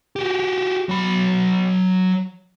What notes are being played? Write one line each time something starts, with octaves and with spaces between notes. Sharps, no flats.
F#4 G4
F#3 B5